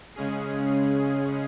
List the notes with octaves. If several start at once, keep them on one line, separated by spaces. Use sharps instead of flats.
C#3 G#3 C#4 G#4